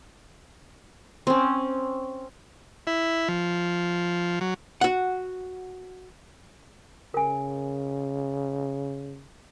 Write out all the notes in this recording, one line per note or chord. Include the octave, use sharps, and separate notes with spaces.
C4 C#4
E4
F3
F#3
F#4 F#5
C#3 A#4 G#5